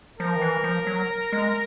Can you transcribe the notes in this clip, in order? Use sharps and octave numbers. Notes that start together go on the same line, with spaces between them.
F3 A#4
D#3
E3
F3
F#3
G#3